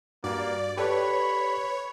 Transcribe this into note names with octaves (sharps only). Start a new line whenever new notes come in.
G2 A#3 F#4 D5
G4 A4 B4 C#5 D5 B5